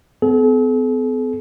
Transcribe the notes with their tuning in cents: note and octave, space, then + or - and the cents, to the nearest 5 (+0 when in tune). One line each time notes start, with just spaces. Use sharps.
B3 +45 A4 -45